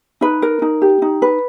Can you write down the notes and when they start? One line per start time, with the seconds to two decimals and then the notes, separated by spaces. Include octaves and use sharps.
0.21 D#4 B4
0.42 A#4
0.62 D#4
0.82 G4
1.02 D#4
1.22 B4